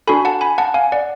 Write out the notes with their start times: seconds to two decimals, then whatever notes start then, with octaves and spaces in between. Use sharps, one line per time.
0.07 D4 F#4 A4 G#5 B5
0.25 F#5 A5
0.41 G#5 B5
0.58 F#5 A5
0.74 F5 G#5
0.92 D5 F#5